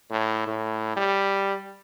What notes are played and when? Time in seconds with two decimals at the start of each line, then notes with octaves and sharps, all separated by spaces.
0.11 A2
0.47 A2
0.96 G3